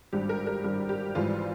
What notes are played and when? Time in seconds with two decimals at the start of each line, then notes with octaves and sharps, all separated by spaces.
0.13 G#1 G2 G3 G4
0.29 A#4
0.47 A#4
0.64 G#1 G2 G3 G4
0.89 G4
1.15 G#1 G#2 E3 G3 F4